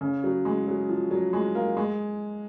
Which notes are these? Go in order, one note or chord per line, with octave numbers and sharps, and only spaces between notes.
C#3
F#3
G#3
F#3
F3
F#3
G#3
A#3
G#3